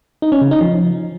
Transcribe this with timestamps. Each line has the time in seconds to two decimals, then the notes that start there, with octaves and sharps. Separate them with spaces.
0.22 D#4
0.32 C#4
0.42 C#3
0.51 D#4
0.61 F3